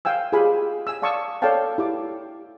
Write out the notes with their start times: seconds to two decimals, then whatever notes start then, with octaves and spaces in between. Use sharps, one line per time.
0.05 F5 G5 G#5 E6
0.32 F4 G4 G#4 F5 G#5 B5
0.87 G#5 E6
1.02 D5 F5 A5 C#6 D#6 E6
1.42 A4 C#5 D5 F5 G5 A5
1.78 E4 G4 D6